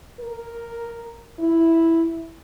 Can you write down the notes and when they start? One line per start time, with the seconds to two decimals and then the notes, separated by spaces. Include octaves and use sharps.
0.20 A#4
1.39 E4